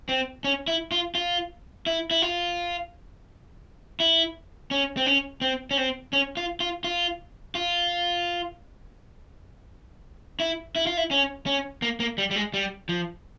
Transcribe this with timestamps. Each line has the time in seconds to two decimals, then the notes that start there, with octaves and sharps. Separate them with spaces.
0.09 C4
0.44 C#4
0.68 E4
0.92 F4
1.15 F4
1.87 E4
2.11 E4
2.22 F4
4.00 E4
4.71 C#4
4.97 C4
5.06 C#4
5.41 C4
5.71 C#4
5.77 C4
6.13 C#4
6.37 F4
6.60 F4
6.84 F4
7.55 F4
10.40 E4
10.76 E4
10.87 F4
10.97 E4
11.11 C#4
11.46 C#4
11.82 A#3
12.00 A#3
12.18 G3
12.31 G3
12.36 G#3
12.54 G3
12.89 F3